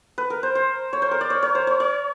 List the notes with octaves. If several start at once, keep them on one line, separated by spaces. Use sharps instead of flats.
B4
A#4
C5
C5
C#5
C5
A#4
D5
C#5
C#5
C5
C#5
C#5